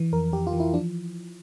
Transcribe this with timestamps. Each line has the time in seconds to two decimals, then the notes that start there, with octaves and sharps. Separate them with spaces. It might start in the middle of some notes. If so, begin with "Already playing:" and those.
Already playing: E3
0.12 F2 A#4
0.33 F2 G4
0.47 F4
0.53 E3
0.60 E4
0.74 F3 D4